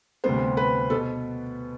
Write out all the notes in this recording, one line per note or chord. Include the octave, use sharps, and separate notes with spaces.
D2 C3 G3 B3 C5
B4
B2 B3 A4